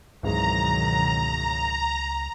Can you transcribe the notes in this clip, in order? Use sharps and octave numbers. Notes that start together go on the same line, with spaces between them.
G#1 C#2 B2 D#3 E3 F#3 G#3 A#5